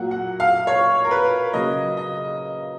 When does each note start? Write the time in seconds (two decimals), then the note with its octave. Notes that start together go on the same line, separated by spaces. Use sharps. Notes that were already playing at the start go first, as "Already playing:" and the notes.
Already playing: A#2 F#3 A#3 F#5
0.11 F#5
0.40 F5
0.67 C#5
1.04 A#4
1.11 B4
1.53 C#3 F#3 A#3 D#5
1.97 D#5